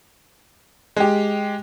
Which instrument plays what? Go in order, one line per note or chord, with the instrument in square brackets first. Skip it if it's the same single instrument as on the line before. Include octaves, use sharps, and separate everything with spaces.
[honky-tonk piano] G#3 G4